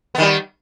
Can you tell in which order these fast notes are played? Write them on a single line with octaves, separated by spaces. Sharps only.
B3 D#3 G3